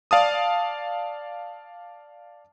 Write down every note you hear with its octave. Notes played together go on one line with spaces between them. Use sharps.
D5 F5 A5 D#6